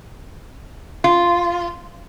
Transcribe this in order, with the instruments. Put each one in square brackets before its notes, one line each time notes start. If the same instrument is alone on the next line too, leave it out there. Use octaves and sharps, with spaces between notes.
[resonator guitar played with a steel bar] F4